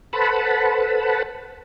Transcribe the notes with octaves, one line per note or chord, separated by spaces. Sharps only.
A4 B4 C5 F#5 A5 B5